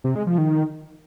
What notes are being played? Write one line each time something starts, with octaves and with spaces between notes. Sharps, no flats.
C3
G#3
F3
D#3